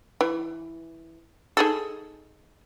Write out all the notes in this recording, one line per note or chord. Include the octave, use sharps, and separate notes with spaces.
E3
D#4 G#4 A4